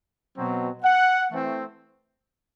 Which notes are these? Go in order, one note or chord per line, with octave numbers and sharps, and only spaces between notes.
B2 F#3 C4
F#5
E3 A3 C4